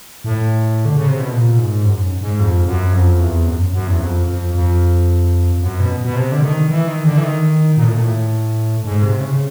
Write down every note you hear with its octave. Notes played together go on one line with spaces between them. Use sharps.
A2
D3
C#3
C3
B2
A#2
G#2
F#2
G#2
F2
F#2
F2
E2
F#2
F#2
E2
F2
F2
F2
F#2
B2
B2
C3
D3
D#3
E3
D#3
D3
E3
D#3
A#2
A2
A#2
A2
G#2
C3
C#3